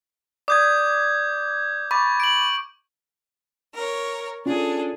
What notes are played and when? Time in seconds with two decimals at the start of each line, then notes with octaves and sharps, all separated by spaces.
0.48 D5 D6 D#6 G6 G#6
1.91 B5 C#6 D6 A6
2.20 D7 F#7
3.74 A#4 C#5
4.46 C#4 D4 F4 G#4 A4